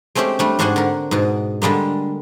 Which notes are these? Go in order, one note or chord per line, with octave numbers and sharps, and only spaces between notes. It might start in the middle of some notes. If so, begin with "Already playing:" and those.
G#3 A3 C4 C#4 G4
G3 A3 D4
G#2 D4 F#4 C5 F#5 G#5
D3 A#4
G#2 B2
D3 G3 G#3 A#3